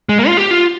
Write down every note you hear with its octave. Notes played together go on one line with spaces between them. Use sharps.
G#3
A#3
F4
G4
F4